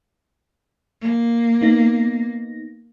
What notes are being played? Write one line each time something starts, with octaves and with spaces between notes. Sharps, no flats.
A#3
B3 D#4 A#6